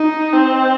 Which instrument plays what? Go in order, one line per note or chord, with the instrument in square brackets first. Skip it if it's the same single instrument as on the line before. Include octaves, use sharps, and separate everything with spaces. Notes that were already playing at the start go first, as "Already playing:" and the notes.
Already playing: [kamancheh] D#4
C4